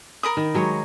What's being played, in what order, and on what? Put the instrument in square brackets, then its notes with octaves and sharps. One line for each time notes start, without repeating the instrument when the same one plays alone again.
[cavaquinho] A#4 B5 D#6
[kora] D#3
F#3 G#3 C#5